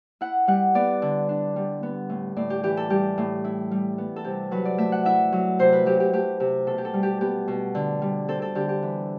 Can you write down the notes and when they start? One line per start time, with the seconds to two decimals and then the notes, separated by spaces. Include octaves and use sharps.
0.21 E4 F#5
0.48 G3 F#5
0.75 B3 D5
1.02 D3
1.29 D4
1.56 G3
1.83 B3
2.09 A2
2.36 A2 D5
2.50 G4
2.63 E3 G4
2.77 A4
2.90 G3 G4
3.18 A2
3.44 E4
3.71 G3
3.98 B3
4.16 A4
4.24 C3 G4
4.51 F#3 B4
4.65 D5
4.78 A3 E5
4.92 F#5
5.05 E4 E5
5.32 F#3
5.59 C3 C5
5.73 B4
5.86 F#3 G4
6.00 G4
6.13 A3 G4
6.40 C3 G4
6.67 B2 A4
6.78 G4
6.85 A4
6.94 G3
7.03 G4
7.21 B3 G4
7.48 B2
7.75 D3
8.02 G3
8.28 C4 A4
8.42 A4
8.55 D3 G4
8.69 G4
8.83 E3